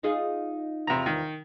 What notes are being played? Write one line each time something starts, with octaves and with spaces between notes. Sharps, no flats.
D#4 F4 G#4
E2 C3 F3 A#5
D#3